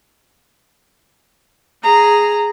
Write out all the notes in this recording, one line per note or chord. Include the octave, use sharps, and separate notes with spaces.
G#4 A#5